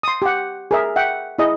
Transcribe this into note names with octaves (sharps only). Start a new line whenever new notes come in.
C6 D#6
G4 F#5
G#4 A#4 E5
E5 F#5 G5
E4 G#4 D#5